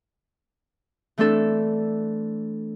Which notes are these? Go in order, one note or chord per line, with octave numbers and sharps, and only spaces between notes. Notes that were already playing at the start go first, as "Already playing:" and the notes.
E3 A3 C4 D4 A4